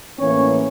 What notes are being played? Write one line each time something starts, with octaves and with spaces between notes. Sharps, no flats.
A2 E3 A#3 C#4 C#5